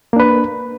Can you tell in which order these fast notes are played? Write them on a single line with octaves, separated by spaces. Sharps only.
A#3 D4 B4